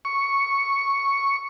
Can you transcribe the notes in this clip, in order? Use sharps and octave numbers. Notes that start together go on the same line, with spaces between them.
C#6